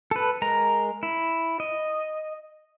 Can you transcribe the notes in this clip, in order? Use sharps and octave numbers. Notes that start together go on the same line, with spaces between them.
A4 B4
G#3 A#4 A#5
E4
D#5